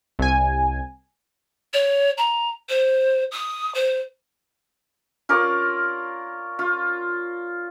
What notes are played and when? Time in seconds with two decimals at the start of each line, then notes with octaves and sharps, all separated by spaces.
0.19 C2 G#5
1.74 C#5
2.18 A#5
2.69 C5
3.32 D#6
3.75 C5
5.29 F4 A#4 C#5 D5
6.59 F4